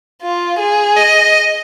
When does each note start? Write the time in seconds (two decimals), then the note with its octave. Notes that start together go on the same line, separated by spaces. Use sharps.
0.22 F4
0.59 G#4
0.96 D#5